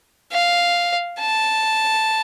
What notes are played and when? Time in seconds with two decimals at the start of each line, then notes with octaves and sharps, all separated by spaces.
0.32 F5
1.21 A5